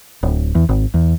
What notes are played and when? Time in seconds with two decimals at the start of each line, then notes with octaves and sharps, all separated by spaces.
0.23 D1
0.55 E2
0.69 G#1
0.94 E2